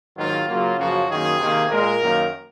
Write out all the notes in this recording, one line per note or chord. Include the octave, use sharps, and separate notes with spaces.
G#2 D#3 F#3 A#3 F4
C#3 F#3 A#3 F4
F#2 C#3 F3 A#3 F#4
F#2 D#3 A#3 G#4
C3 D#3 A#3
A#2 G#3 A#4
F#2 D#3 A#3